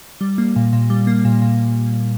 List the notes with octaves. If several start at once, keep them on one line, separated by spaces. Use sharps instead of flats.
G3
A#3
A#2
A#2
G3
A#3
A#2
A#2